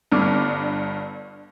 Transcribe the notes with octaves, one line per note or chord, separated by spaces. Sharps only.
G1 G2 B3 D6 F6